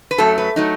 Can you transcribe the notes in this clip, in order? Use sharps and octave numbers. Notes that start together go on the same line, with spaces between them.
B4
F#2 F#3 A3 A4
B4
F#3 A3 D#4